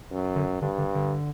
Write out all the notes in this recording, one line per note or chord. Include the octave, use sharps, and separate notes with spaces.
F#2
D3
G2 D3
D3
D3